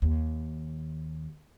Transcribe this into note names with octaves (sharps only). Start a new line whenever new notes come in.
D#2